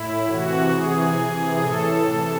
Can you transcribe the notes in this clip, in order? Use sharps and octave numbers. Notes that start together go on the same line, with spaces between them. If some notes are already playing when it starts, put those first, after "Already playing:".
Already playing: A2 E4
C3 E3 F#4
C3 E3 G#4
C3 E3
A2 E3 A4
C3 E3